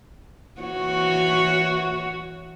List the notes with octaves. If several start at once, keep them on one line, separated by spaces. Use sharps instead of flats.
E3 F#4 C#5